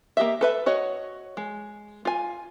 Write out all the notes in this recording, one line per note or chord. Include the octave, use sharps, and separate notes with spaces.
A#3 G4 D#5 E5
A4 B4 E5
F#4 C#5 D#5
G#3
F4 G#5